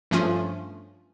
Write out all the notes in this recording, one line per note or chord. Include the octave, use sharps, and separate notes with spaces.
G2 F3 A3 C#4 F4